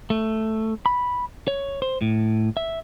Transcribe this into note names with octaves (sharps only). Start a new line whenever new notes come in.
A3
B5
C#5
C5
A2
E5